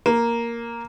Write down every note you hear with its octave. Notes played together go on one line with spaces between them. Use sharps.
A#3